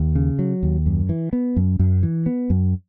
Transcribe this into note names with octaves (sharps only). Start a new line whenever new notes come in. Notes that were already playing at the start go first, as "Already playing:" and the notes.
Already playing: D#2
C#3
F#3
D#2
F#2
E3
B3
F#2
F#2
E3
B3
F#2